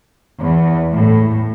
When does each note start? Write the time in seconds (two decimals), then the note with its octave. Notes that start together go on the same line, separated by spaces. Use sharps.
0.41 E2
0.92 A2